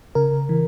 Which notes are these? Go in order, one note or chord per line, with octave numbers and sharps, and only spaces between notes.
C#3 A#4
E3